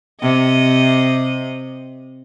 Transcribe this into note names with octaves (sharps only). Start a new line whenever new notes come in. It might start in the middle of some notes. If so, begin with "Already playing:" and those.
C3 D#5